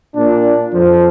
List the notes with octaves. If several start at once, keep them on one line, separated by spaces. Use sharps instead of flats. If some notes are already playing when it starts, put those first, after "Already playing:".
A#2 D4
F2 F3